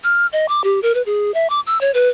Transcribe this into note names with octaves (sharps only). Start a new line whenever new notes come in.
F6
D#5
D6
G4
A#4
B4
G#4
E5
D6
E6
C#5
B4